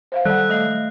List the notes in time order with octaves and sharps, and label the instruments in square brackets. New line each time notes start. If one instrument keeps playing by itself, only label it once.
[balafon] C5 E5 F5
[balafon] D#3 F#5 [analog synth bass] G3 [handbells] A4 [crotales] F#6
[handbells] A3 D#5 F5